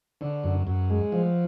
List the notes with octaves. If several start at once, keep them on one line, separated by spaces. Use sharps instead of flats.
D3
F#2
F#2
G#3
F3